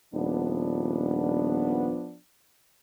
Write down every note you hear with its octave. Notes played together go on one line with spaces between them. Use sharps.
D#1 F3 B3 D4